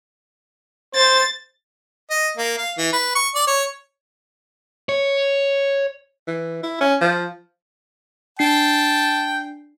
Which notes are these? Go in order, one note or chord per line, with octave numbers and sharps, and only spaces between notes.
C5 A6
D#5
A#3
F5
E3
B4
C#6
D5
C#5
C#5
E3
E4
C#4
F3
D4 G5 A5 C7